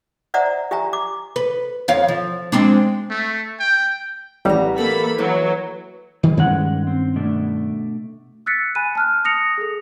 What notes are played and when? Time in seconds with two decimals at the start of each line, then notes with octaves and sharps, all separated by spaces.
0.34 C5 D5 E5 F#5 A#5
0.71 G4 E5 G#5 A#5
0.93 D6
1.36 B4
1.88 F2 C#5 F5
2.08 F3
2.52 G#3 C4 D4
3.10 A3
3.60 G5
4.45 A1 F#3 G3 B3 A#5
4.78 E3 A3 A#3 A4 B5
5.18 E3 F#3
6.23 D#3 G3 G#4
6.37 G2 D#3 G3 G#3 C#4 F#5
6.87 C4
7.16 B2 A3 D4
8.46 E6 F#6 A6 B6 C#7
8.75 G#5 B5 F#6 D#7
8.95 A5 F6 F#6
9.25 D#6 A#6 C#7 F7
9.58 G#4 A4